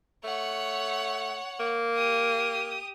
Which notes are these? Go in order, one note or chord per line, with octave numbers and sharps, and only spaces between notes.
A3 C#5 F#5
A#3
G4 D#6